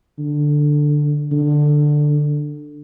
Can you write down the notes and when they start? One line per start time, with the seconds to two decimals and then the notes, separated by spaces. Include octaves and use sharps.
0.19 D3
1.32 D3